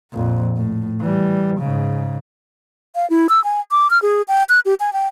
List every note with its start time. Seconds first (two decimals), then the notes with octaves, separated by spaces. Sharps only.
0.12 A#1 F2
0.57 A2
1.00 E3 G3
1.59 G#2 C#3
2.95 F5
3.10 E4
3.29 E6
3.44 G#5
3.71 D6
3.90 F6
4.02 G#4
4.28 G5
4.49 F#6
4.65 G4
4.80 G#5
4.93 G5